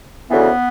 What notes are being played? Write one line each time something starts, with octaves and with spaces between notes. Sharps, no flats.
D2 C#3 E3 B3